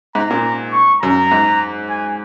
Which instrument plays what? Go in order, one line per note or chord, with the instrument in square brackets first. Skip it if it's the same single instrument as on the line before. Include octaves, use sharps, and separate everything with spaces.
[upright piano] G#2 [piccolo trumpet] A#5
[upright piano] A#2
[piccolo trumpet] C#6
[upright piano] F#2 [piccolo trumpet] A#5
[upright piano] G#2
[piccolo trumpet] G#5